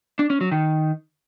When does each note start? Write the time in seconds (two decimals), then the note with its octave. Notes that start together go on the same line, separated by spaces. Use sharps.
0.19 D4
0.30 C#4
0.41 F#3
0.52 D#3